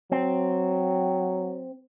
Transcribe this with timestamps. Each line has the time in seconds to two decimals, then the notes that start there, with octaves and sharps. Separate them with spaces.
0.12 F#3 C4